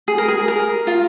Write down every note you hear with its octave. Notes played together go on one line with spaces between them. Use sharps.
G#4
A#4
G#4
A#4
F4